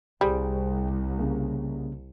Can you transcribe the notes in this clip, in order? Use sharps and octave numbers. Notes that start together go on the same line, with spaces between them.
C2 G3 G#4 C5 G5
C#3 A#3